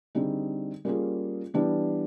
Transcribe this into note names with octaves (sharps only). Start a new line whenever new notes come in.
D3 G3 C4 D#4 G#4
G3 A#3 C#4 F4 G#4
E3 G3 B3 D4 G4